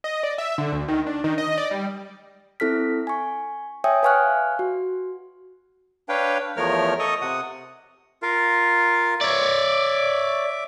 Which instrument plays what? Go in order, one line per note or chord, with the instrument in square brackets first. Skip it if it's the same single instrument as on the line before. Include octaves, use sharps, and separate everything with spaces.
[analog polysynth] D#5
D5
E5
D3
D2
D#3
D4
D#3
D#5
D5
G3
[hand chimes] C4 E4 A4 F6 B6
G#5 C#6
C#5 E5 G5 G#5 D#6
B4 F5 G#5 C#6 F6 F#6
F#4
[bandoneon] D4 B4 C#5 F5 G5
E2 F3 A3 A#4 C#5 F6
A4 D#5 C#6 D#6
C3 F#5 D#6
F4 A#4 F5
[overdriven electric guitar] C#5 D5 [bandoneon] E5 D6